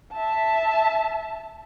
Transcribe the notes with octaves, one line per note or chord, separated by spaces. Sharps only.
E5 A5